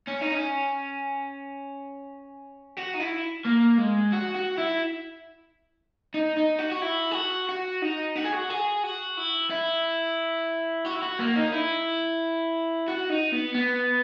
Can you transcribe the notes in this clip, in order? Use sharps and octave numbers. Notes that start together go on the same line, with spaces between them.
C#4
D#4
C#4
F#4
D#4
E4
A#3
G#3
F#4
F#4
E4
D#4
D#4
F#4
F#4
E4
G#4
F#4
F#4
D#4
F#4
G#4
F#4
G#4
F#4
E4
E4
F#4
E4
F#4
A#3
D#4
E4
F#4
D#4
B3
B3